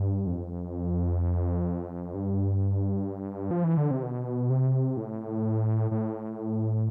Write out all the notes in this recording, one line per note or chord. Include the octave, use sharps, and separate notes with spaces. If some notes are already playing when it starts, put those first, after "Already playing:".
Already playing: G2
F2
G2
F3
E3
D3
C3
B2
C3
A2
A2